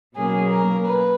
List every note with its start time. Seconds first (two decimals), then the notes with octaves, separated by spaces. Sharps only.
0.16 B2 F#3 A#3 C#4 G#4
0.51 A#4
0.86 B4